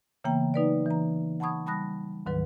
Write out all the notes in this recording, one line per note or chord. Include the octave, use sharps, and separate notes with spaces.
C#3 E3 A#3 B3 G5 A#5
F#3 D#4 B4 D5
E3 A#5
F#5 A5 B5 C#6 D#6 G#6
G3 A5 B5 D#6 F#6 A#6
D2 G#2 D#3 F#3 B4